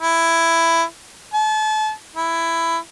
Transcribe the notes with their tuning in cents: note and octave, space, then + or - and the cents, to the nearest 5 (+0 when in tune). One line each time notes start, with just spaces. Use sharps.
E4 +10
A5 -35
E4 +10